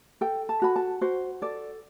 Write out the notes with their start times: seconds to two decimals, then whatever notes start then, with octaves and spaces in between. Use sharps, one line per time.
0.21 A4 G5
0.49 A5
0.62 F#4 B5
0.76 A5
1.01 F#4 C5
1.42 A4 D5